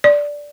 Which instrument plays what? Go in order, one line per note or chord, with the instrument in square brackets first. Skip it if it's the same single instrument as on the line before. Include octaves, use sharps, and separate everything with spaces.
[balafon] D5